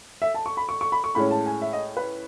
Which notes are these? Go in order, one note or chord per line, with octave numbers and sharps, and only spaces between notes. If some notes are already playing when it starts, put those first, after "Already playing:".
E5
A5
C#6
B5
C#6
C#6
B5
C#6
A2 G#3 C#4 B5
A5
G#5
E5
D#5
B4